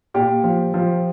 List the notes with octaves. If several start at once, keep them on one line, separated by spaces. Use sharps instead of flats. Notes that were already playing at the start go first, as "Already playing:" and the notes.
A#2 G4
F3
F3